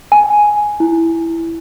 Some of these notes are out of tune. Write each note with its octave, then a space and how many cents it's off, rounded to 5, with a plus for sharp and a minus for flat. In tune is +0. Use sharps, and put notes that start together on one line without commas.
G#5 +5
E4 +5